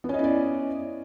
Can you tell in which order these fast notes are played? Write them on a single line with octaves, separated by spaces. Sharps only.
B3 C#4 D#5 E4 D5